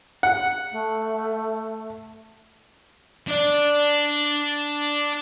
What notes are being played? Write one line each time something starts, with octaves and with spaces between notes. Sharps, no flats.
F#5
A3
D4 D5